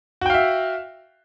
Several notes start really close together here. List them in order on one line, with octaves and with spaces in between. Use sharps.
F#4 G5 F5 E5